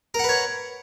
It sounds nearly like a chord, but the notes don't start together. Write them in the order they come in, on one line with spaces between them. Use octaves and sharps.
A#4 F#5 B4 C#5